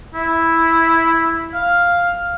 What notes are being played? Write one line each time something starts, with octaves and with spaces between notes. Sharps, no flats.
E4
F5